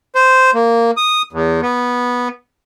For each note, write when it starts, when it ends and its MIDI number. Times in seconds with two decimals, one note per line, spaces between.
0.15 0.51 72
0.54 0.91 58
0.97 1.22 87
1.33 1.61 40
1.62 2.28 59